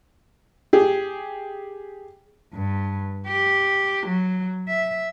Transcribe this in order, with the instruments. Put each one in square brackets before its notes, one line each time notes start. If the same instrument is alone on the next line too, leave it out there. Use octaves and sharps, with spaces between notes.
[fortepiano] G4 G#4
[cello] G2
G4
F#3
E5